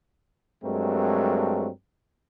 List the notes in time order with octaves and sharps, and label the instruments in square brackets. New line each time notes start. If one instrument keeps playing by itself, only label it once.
[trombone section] G2 F#3 G#3 A3 C4 A#4